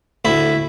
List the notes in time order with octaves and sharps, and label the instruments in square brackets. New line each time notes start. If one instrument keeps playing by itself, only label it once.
[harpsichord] D2 E4